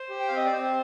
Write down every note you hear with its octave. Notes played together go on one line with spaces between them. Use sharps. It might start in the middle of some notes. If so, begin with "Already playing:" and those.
Already playing: C5
G4
G5
C4 F5
D#5
D5
C4 C5